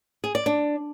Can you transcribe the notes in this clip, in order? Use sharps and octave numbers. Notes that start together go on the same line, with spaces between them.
G#4
D5
D4